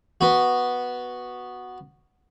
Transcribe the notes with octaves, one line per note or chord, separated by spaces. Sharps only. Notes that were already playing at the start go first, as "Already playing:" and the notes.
B3 F#4